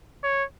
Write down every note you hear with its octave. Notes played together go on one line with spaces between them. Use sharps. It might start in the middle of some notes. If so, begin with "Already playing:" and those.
C#5